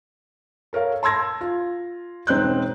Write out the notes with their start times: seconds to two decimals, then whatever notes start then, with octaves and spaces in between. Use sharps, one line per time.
0.73 A4 A#4 C#5 F5
1.03 A5 C6 E6 G#6 A#6
1.41 F4
2.27 E1 C4 D#4 F#6 G6